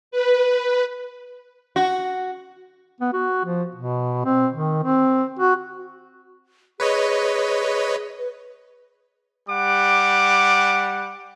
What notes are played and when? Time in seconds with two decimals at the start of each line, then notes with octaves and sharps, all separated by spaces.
0.11 B4
1.76 F#4
3.01 B3
3.13 F#4
3.45 F3
3.75 B2
4.25 C4
4.53 D#3
4.83 C4
5.39 F#4
6.80 G#4 B4 C#5 D#5
7.66 G#4
8.18 B4
9.49 G3 F#5 D6